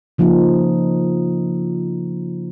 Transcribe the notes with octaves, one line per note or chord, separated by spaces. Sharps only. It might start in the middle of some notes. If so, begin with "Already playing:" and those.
C#3 F3 A#3 D#4